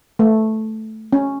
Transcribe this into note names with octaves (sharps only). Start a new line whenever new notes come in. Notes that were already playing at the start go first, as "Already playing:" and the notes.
A3
C#4